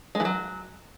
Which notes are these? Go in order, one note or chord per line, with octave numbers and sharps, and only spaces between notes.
G#3
E3
F#3